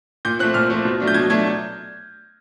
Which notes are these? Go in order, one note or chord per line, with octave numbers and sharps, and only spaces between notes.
A#2 G6
F3 A3 C4 F#6
A#2 F6
F3 A3 C4
B2
F#3 A3 D4
G6
B2 G#6
F#3 A3 D4 G#6